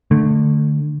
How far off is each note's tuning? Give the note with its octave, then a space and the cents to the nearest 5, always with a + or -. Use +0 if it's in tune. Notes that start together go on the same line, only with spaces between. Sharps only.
D3 +20 A3 +0